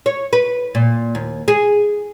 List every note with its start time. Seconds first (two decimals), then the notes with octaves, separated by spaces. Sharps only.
0.06 C#5
0.33 B4
0.75 A#2
1.15 D#2
1.48 G#4